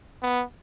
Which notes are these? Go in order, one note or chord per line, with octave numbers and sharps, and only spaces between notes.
B3